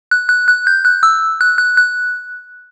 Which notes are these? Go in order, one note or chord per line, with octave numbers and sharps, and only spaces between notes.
F#6
F#6
F#6
G6
F#6
E6
F#6
F#6
F#6